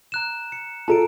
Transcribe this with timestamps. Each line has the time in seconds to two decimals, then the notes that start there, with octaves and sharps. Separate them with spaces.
0.12 A#5 F#6 E7
0.52 C#7
0.88 F4 A4 A5 A#5 D7